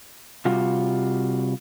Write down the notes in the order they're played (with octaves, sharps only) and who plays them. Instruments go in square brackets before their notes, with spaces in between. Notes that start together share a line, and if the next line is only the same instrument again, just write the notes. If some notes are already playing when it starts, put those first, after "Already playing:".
[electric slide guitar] C3 G3 F4 F#4